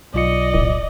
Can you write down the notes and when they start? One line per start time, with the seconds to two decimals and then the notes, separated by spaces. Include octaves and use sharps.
0.14 B1 F4 D5 D#5 C#7
0.54 D1